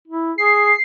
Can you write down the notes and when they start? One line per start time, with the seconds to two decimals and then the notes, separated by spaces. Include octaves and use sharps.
0.08 E4
0.38 G#4 C7